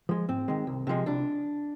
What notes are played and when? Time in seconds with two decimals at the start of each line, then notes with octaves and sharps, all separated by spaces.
0.09 F3 G#3
0.29 G#2 C4
0.48 D#3 G#3
0.67 C2
0.87 C3 F3 G#3
1.06 C2 D4